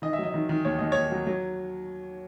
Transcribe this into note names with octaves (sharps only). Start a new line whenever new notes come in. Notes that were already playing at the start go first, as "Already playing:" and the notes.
D#3 D#5
E5
F#3 D#5
D#3
D#3
D#2 C#5
D#2 D#5
D#2 C#5
F#3
F#3